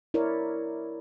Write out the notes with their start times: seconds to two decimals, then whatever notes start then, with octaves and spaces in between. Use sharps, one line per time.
0.14 E4 A#4 C#5 D5